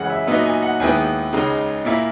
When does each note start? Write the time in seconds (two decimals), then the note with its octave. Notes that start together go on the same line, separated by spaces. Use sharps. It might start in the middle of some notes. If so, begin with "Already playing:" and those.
Already playing: F#2 C#3 E3 G#3 F#5
0.10 E5
0.27 A#2 F#3 B3 D#4 E5
0.45 G#5
0.62 F#5
0.80 D#2 D#3 G#3 B3 E4 G#5
1.33 C#2 C#3 G#3 D#4
1.85 A#2 A#3 E4